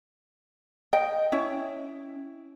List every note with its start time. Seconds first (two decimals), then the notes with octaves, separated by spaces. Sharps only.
0.93 D#5 G5
1.32 C#4 E4